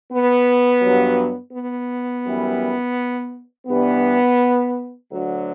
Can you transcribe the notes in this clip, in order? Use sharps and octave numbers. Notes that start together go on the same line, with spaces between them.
B3
G2 F#3
B3
F#2 E3 G3
G2 E3 G3 B3
D2 D3 F#3